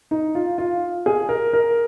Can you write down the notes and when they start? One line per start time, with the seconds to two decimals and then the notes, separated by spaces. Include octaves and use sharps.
0.11 D#4
0.35 F4
0.58 F4
1.06 G#4
1.29 A#4
1.53 A#4